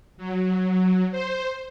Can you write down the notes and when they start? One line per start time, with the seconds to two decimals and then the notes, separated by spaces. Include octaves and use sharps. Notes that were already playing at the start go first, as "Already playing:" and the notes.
0.17 F#3
1.11 C5